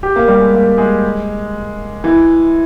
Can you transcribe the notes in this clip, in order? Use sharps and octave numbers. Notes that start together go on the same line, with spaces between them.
G4
A#3
G3
G#3
A#3
G#3
E3